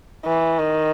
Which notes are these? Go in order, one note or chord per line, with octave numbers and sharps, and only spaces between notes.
E3
D#3